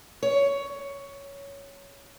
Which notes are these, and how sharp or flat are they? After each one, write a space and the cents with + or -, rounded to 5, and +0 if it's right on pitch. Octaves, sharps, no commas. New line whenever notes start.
C#5 +10